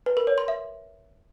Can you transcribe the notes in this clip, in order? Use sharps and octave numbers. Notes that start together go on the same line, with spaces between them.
B4
A#4
C#5
C6
E5